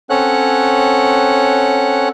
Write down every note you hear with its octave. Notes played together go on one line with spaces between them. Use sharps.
C4 C#4 A4 C#5 F#5 F#6